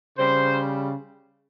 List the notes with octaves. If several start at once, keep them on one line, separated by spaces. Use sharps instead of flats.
C#3 G3 C5